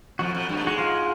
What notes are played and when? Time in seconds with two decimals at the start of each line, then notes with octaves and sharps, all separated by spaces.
0.19 F2 F3 F#4
0.34 F2 F3
0.49 G2 G3
0.57 A3
0.63 G#2 G#3 F#4
0.78 F4